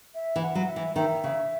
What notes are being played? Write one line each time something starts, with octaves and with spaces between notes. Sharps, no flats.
E5
E3
F#5
F#3
E5
E3
D#3 E5
C#3